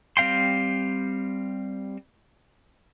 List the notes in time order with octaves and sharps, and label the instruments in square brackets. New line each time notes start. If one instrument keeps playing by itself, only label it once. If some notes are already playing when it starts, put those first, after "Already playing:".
[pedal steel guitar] G3 C4 F5 G5 C6